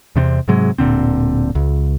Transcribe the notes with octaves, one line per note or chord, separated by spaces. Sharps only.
E2 C3 B3 C4
G#2 C3 F#3 G#3
D1 A#2 D3 C4
C#2